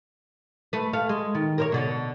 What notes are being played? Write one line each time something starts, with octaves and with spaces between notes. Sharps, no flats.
A3 B4
A3 F5
G#3
D#3
A#4 C5 C#5
B2 D3 A4